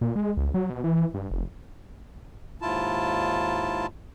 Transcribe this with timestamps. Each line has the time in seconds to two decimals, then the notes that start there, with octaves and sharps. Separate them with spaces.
0.01 A#2
0.16 G#3
0.37 C#2
0.54 F#3
0.70 B2
0.84 E3
1.14 G2
1.31 F1
2.62 D#2 G#2 E4 F4 A5